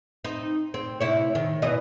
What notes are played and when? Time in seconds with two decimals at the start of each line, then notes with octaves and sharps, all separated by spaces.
0.25 C4 D#4
0.74 C4
1.00 C3 E4 C#5
1.35 D#3
1.62 B2 E3 D#5